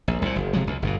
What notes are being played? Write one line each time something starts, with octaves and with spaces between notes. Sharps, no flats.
A#1
C2 A#2
F#1
C3 F3 F#3 G#3
C#2
G1 G2 B2